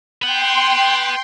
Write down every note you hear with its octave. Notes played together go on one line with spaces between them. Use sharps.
B4 F#5 G5 C6